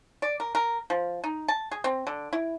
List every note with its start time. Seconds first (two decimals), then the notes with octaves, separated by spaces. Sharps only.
0.22 D5
0.40 A#4
0.55 A#4
0.90 F3
1.24 D#4
1.48 A5
1.71 G#4
1.84 C4
2.07 D3
2.33 E4